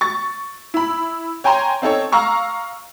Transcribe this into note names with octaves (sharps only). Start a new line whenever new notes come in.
C#6 A6
E4 B5
C#5 G5 G#5 A#5 C6
C4 D#4 A4 C#5
F5 A#5 C#6 E6